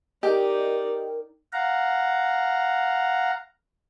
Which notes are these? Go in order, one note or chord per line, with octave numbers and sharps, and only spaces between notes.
D#4 G4 A#4 D5 D#5 G5
F5 F#5 A#5